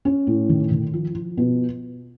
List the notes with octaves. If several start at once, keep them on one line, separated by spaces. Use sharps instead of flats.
C#4
A2
D#3
D#3
F3
F3
B2